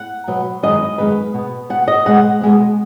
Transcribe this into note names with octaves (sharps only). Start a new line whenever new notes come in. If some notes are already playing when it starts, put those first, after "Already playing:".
Already playing: F#5
B2 F#3 B3
F#2 D#3 G#3 B3 D#5
F#2 D#3 G#3 B3 B4
B2 B3
B2 B3 F#5
D#5
B2 G#3 B3 F#5
B2 G#3 B3